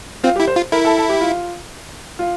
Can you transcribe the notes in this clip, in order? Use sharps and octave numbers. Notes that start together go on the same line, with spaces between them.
C4 F4
G4
E4
C5
F4
E4 A#4
A4
A4
G4
F4
F4